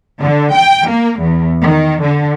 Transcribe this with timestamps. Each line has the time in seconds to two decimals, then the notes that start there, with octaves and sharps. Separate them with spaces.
0.20 D3
0.53 G5
0.89 A#3
1.20 E2
1.62 D#3
2.03 D3